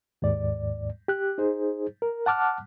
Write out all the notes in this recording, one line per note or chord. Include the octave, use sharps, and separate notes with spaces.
D#2 G#2 D5
G4 F#6
D#4 G#4 C5
A#4
F#5 A5 D6 F6 F#6